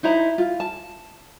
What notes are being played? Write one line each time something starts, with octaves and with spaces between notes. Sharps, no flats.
D#4 E4 C5 A#5
F4
A5